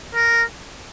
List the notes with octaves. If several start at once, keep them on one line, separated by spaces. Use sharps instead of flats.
A#4